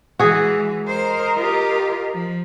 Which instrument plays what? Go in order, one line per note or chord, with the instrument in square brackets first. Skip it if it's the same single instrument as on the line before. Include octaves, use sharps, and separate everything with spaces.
[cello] E3 G#3 [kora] F#4 G#4
[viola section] A#4 D#5 [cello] C5
[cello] F4 G4
F3